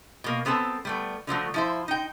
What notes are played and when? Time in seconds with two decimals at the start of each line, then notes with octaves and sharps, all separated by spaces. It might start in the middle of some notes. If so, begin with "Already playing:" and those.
0.24 B2 A#3
0.45 F#3 B3 C4 A4 A5
0.85 G3 A3 B3
1.27 D3 F3 F#3 A3
1.54 F3 E4 C5
1.88 D#4 G5